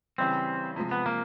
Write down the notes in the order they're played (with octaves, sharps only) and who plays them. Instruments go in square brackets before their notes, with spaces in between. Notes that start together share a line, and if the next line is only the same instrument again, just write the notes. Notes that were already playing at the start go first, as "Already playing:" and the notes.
[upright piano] C#3 E3 G3 [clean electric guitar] C4
[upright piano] C3 F3 G#3
[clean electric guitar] B3
A#3